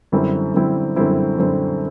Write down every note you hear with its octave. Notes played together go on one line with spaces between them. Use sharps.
F#2 D3 G3 C4 E4
F#2 D3 G3 C4 E4
F#2 D3 G3 C4 E4
F#2 D3 G3 C4 E4